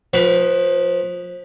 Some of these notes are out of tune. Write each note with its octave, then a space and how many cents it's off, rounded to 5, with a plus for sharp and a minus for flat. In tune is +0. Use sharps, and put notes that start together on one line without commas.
F3 +25 B4 +0